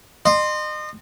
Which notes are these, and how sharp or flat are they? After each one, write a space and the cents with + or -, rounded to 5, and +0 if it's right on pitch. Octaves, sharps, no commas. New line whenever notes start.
D#5 -35 C6 +0